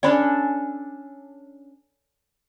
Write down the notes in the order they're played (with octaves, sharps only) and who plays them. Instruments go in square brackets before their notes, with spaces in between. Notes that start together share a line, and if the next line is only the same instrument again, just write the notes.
[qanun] C#4 D4 A4 [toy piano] D5 G#5 B5